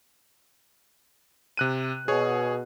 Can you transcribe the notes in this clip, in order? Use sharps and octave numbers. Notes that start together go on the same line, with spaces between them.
C3 F#6 D#7
B2 G#4 C#5